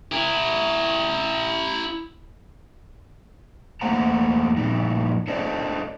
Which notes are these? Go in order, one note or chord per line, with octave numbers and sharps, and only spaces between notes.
E4 A#4
E2 A3 A#3 C5 F#5 A#5
A#2 F3 G3 D#4
D4 A4 C5 C#5 D#5